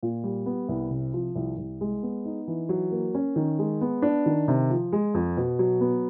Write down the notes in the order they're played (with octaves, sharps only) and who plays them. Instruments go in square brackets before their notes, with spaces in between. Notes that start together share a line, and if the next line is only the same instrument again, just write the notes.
[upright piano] A#2
G3
B3
C2
C3
F3
C2
C2
G#3
B3
D#4
E3
F#3
A#3
C#4
D#3
G#3
B3
D4
D#3
C3
F3
G#3
F2
B2
F#3
B3